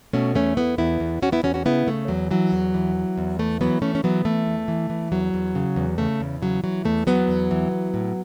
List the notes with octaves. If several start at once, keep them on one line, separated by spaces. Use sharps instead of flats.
B2 A3 C#4
E2 A3 C#4
E2 B3 E4
E2 B3 E4
E2
E2 C#4 F#4
B3 E4
E2 C#4 F#4
C#4 F#4
C#3 B3 E4
C#3 A3
E2 F#3
E3 F#3
E2
E3
E3
E2
E3 A3
E3 F#3 B3
E3 A3 C#4
C#4
E3 F#3 B3
E3 A3
E2
E3
E3
E2 F#3
E2
C#3
E2
C#3 A3
E2
C#3 F#3
E3 F#3
E2 A3
E2 F#3 B3
E2
E3
E3
A2